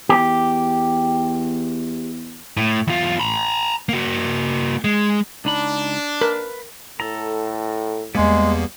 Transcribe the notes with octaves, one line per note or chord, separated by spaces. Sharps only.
E2 G4
A2
E2 F4
A#5 B5
A#3 F#4
G#3
C#2 D4 D#4 B5
A#4 B4
A2 A4 A#5
E2 G3 G#3 A#3 B3 G#4